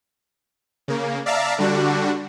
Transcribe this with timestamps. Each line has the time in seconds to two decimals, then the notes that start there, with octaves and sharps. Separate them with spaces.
0.88 C#3 A#3
1.26 D5 E5 F5 A5 A#5
1.58 D3 G3 D4 F#4